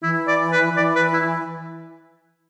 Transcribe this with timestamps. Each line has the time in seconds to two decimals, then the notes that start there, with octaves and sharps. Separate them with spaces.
0.02 E3 E4
0.27 D5
0.52 B4
0.76 E3 D5
0.95 B4
1.13 E4